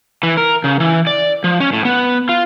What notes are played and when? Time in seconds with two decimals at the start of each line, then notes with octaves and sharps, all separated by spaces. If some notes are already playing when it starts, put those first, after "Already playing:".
0.23 E3
0.37 A#4
0.64 C#3
0.80 E3
1.07 D5
1.44 F3
1.60 C#4
1.73 A2
1.85 B3
2.29 F4